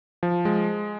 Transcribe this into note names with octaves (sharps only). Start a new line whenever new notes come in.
F3
G#3